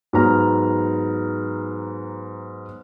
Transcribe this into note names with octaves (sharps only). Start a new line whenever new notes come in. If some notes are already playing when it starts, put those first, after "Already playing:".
G#2 F#3 B3 A#5 F6